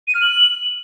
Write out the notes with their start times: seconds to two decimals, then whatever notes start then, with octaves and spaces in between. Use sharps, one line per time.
0.07 D#7
0.14 F6
0.21 F#7